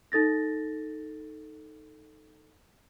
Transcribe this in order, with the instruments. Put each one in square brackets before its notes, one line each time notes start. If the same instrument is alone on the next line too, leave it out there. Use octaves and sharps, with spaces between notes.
[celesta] D#4 A4 A6 A#6